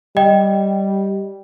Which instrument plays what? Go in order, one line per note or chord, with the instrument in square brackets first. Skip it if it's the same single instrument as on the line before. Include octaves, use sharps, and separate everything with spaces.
[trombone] G3 [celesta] D#5 G5